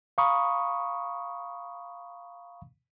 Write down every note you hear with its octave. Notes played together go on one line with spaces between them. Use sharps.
F5 A#5 B5 C#6 D#6